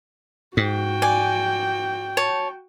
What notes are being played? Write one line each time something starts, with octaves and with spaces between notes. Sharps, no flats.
G#2 F#4 G5
D5 G#5
C#5 A5